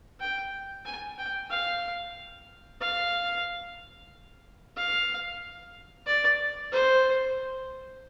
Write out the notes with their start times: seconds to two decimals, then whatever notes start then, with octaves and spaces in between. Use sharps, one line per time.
0.20 G5
0.85 G#5
1.18 G5
1.51 F5
2.81 F5
4.77 F5
6.06 D5
6.72 C5